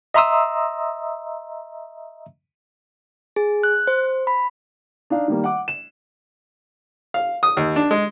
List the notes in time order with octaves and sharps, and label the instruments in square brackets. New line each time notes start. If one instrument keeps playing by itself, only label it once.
[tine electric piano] D#5 E5 A#5 C6 D#6 E6
[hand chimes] G#4
F#6
C5
B5
[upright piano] D4 D#4 F5
D#3 G3 A#3
F#5 D6
E7
[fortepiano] F5
D#6
D#2
D4
G#3